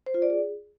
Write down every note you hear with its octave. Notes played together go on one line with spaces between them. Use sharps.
C5
F4
D5
G#4